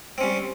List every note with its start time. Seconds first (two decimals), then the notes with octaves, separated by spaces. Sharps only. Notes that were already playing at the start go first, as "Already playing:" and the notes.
0.18 C4
0.21 C#4
0.23 G3